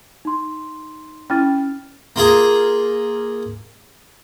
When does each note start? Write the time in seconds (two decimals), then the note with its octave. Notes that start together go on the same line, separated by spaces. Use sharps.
0.25 D#4 C6
1.30 C#4 E4 G5 F6 A6
2.16 A#3 F4 G#4 A#4